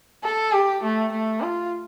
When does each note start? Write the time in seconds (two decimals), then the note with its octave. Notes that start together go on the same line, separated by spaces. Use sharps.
0.24 A4
0.53 G4
0.83 A3
1.12 A3
1.41 F4